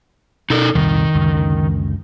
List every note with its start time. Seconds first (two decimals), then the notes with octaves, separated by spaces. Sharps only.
0.50 B2 D#4 A4 A#4
0.75 C2 F2 A#2 D#3
1.15 C#2 F#2 D3